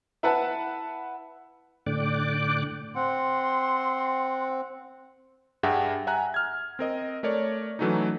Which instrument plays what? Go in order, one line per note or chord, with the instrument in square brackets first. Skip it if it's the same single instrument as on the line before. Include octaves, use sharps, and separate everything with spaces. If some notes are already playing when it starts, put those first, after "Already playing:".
[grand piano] E4 B4 E5 F#5 A5
[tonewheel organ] A2 D3 D5 G5 D6 F#6
[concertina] C4 [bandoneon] F#5 [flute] C6
[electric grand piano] G2 G4 G#4 E5 F#5 G5
E5 F#5 G#5 A#5 F#6
F6 G#6
C4 A#4 D#5
A3 A#4 C#5 D5
E3 F#3 A3 C#4 D#4